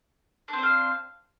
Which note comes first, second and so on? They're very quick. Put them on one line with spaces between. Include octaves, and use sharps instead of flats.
D4 C4 C5 F5